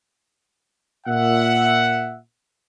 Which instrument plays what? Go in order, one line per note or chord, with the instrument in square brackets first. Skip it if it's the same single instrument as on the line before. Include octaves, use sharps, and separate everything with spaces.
[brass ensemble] A#2 E5 F#5